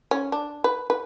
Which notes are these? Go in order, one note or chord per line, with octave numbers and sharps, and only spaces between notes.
C#4
D4
B4
B4